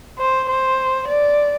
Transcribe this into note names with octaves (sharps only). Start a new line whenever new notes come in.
C5
C5
D5